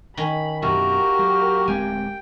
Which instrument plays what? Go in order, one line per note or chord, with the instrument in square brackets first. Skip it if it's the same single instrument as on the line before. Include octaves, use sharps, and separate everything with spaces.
[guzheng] D#3 C#4 [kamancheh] B5
[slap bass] F#2 B2 D3 [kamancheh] A#3 G4 [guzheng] E4 [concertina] F#4 A#4
[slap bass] F#3
[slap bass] D1 G#3 C4 [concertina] G5 [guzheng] G#5